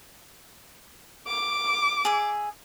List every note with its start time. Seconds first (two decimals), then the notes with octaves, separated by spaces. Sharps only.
1.27 D6
2.05 G#4 E5